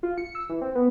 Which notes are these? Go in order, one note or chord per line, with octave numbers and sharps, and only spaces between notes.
F4
C#7
E6
E3
C4
B3